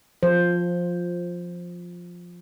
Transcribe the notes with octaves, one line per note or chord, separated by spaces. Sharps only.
F3 C5